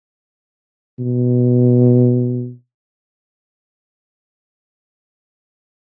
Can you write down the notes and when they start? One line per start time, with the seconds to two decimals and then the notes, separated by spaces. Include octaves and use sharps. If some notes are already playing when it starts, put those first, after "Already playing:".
0.99 B2